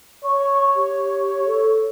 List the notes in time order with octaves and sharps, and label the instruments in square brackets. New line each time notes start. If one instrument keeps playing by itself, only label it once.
[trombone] C#5 [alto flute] C#6
[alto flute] G4
A4